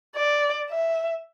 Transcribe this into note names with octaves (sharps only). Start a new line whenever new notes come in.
D5
E5